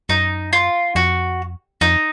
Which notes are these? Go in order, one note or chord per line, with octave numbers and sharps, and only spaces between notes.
F#2 D#4
F4
F2 F#4
F2 D#4